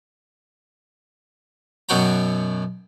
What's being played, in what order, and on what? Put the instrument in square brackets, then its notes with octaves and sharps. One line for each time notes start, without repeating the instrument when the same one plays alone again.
[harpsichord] F#2 B2 F#3 F#4 G5 A#5